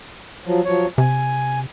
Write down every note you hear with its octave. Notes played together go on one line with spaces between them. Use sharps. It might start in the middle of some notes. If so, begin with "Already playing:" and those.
F3 F#3
F3 F#3 C#5
C3 G#5